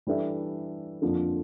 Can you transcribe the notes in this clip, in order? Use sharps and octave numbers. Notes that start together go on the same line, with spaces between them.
E3 G3 D4 A4 E5
F2 D3 F3 A#3